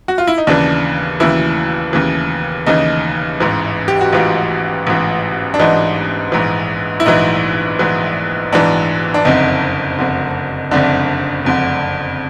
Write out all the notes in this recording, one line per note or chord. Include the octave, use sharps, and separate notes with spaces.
F#4
F4
E4
D#4
D#2 C#3 E3 D4
D#2 C#3 E3 E4
D#2 C#3 E3
D#2 C#3 E3 D#4
A1 G#2 E3
G4
F#4
A1 G#2 E3 F4
A1 G#2 E3
D4
A1 G#2 E3 D#4
A#1 G#2 E3
E4
A#1 G#2 E3 D#4
A#1 G#2 E3
A#1 G#2 E3 D4
D4
F#1 F2 D3 D#4
F#1 F2 D3
F#1 F2 D3 D4
F#1 F2 D3